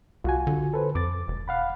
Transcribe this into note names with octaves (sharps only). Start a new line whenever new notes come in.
C2 F4 F#4 G#5
D3
A4 B4 C5
F2 D6 A6
E1
F5 F#5 B5